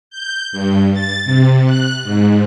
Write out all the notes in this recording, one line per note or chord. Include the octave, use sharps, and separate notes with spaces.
G6
G2
A6
C3
F#6
G#2